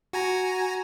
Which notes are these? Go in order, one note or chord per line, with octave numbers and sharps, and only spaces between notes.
F#4 G#5 A#5